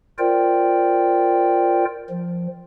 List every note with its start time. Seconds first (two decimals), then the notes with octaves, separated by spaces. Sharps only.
0.18 F4 A#4 C5 D5 G5
2.09 F3